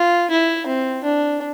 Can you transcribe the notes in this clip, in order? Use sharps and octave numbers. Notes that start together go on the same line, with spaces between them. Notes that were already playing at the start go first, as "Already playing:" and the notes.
Already playing: F4
E4
C4
D4